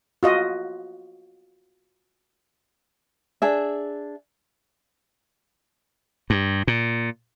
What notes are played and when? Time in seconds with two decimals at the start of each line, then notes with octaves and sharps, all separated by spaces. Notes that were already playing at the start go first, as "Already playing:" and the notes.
0.23 F4 F#4 D#5
3.42 D4 G#4 E5
6.30 G2
6.67 A#2